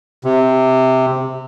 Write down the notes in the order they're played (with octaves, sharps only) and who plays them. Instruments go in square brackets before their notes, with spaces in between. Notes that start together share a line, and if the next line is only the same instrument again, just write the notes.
[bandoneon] C3